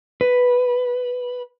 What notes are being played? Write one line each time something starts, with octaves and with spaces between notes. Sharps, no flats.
B4